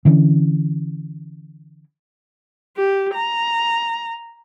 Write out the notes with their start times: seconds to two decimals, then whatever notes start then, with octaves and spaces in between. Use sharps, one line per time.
0.05 D3 E3 C#4
2.77 G4
3.14 A#5